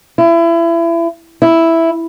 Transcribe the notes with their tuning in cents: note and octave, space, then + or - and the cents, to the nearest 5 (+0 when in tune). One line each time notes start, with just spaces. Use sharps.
E4 +30
E4 +0